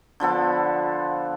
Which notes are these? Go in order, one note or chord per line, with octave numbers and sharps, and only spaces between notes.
D3 F3 B3 A4